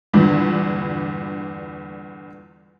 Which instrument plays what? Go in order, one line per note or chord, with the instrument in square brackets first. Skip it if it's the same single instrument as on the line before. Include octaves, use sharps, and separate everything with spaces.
[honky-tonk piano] E2 G2 A#2 D3 B3 D4